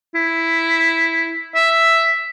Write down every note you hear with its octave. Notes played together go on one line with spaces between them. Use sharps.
E4
E5